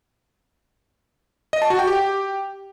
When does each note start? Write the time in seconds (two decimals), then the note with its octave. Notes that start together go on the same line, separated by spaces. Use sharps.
1.53 D#5
1.62 A5
1.70 F#4
1.79 G5
1.87 G4